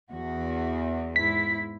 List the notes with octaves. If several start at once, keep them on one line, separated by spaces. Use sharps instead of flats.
E2 F#4
G#2 E4 B6